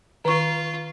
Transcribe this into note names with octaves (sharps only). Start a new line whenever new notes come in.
D#3 F4 B4 C#6